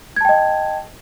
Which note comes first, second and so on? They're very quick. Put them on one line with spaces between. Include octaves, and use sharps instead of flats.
G#6 A5 G5 D#5